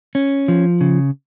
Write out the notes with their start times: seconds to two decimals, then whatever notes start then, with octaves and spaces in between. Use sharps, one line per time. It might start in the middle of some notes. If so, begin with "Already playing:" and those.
0.15 C#4
0.48 F3
0.81 C#3